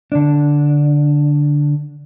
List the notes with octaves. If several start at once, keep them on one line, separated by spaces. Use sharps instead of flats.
D3 D4